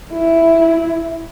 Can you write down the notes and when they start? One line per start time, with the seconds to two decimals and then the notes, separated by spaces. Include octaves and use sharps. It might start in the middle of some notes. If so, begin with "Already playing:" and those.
0.13 E4